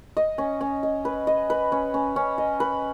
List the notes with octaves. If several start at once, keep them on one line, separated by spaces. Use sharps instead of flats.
D#5
C#4
C#4
D#5
B4
D#5
B4
C#4
C#4
C#4
D#5
B4